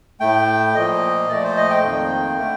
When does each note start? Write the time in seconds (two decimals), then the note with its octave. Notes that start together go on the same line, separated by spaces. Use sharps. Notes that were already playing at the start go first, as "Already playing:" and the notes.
0.20 A2 A3 G5
0.75 A#2 F3 A#3 D#5
1.29 A#2 F3 A3 D5
1.44 C5
1.57 D#5
1.70 G5
1.83 F2 D#3 A#3
2.38 D3 A3